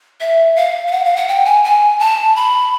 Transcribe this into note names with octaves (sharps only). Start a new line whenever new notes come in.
E5
F5
F5
F#5
F5
F#5
G5
G#5
G#5
A5
B5